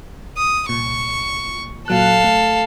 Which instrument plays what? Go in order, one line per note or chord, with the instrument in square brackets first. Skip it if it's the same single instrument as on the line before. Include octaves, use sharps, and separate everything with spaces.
[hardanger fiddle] D#6
[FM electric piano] C2 A#2 [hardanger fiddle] C#6
[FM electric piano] A#2 F#3 F#6 [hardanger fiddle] A4 F5
[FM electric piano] A3